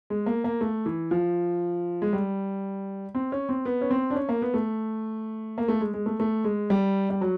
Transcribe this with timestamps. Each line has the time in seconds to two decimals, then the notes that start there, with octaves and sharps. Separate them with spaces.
0.10 G#3
0.26 A#3
0.44 A#3
0.61 A3
0.86 E3
1.11 F3
2.02 G#3
2.13 G3
3.15 C4
3.32 C#4
3.49 C4
3.65 B3
3.81 C#4
3.91 C4
4.10 D4
4.16 C#4
4.29 A#3
4.42 B3
4.54 A3
5.58 A#3
5.68 A3
5.81 G#3
5.94 G#3
6.06 A3
6.20 A3
6.44 G#3
6.70 G3
7.10 G3
7.21 F#3